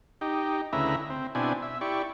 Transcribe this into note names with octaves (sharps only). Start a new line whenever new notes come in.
D#4 G4
D2 C#3 E4 B4 E5 A#5
C4
B2 C4 D4 E4 G#5
E5
E4 G4 D5 C#6